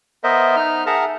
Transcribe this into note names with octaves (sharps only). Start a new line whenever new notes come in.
B3 A#4 C5 D#5 E5
D#4 F6
G#4 A#4 E5 F#5 A5 A#5